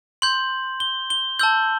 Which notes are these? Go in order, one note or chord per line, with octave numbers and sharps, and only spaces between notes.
C6 G6 F#7
G7
G7
A5 E6 G6 F#7